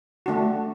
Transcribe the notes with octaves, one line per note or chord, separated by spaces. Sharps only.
A3 D4 F#4